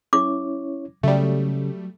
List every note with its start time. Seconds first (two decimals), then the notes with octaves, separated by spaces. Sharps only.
0.13 C#4 E4 C#5 D6
1.03 C#3 F#3 G3 A3